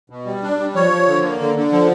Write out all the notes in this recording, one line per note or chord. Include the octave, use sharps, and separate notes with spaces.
B2
G3
D4
G3
F3 C#5
F3
D3
A#3
D3
D3
F3